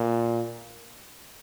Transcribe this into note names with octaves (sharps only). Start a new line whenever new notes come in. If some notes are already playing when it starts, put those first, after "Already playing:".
Already playing: A#2